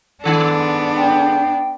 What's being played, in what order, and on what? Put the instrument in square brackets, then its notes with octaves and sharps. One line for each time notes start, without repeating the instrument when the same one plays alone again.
[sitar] G#2 D#3 A4 [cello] B3 D4
[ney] G5